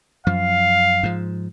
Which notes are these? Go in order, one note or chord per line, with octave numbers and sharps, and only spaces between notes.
F#2 F3 F5
G#2 F3